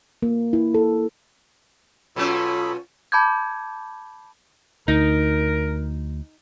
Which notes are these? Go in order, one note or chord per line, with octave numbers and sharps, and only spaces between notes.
A#3
E4
A4
B2 F#3 C#4 F4 A4 C#5 B5
A5 B5 D6 G6 G#6
D2 D#4 A#4